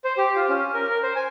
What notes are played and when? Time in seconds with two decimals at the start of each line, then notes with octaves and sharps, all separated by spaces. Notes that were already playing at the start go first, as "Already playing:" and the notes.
0.05 C5
0.18 G4
0.35 F4
0.49 C#4
0.74 A#4
0.90 A#4
1.03 C5
1.15 G#5